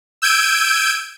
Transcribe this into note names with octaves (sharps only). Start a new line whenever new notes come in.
E6 G6 G#6 D7 D#7